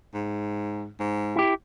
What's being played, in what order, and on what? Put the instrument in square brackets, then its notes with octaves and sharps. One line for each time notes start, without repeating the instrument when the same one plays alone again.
[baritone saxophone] G#2
G#2
[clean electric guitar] E4 G4